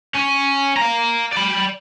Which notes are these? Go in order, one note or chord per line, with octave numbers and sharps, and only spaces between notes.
C#4
F5 A#5
D5 B5